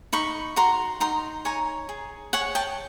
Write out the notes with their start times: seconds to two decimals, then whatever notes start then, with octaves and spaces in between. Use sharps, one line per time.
0.13 D#4 B5 C#6
0.56 F#4 A#5 C6
1.00 D#4 A#5 C6
1.45 C#5 G#5 A#5
1.89 G#4
2.33 C#5 F#5 G#5
2.55 G5 A5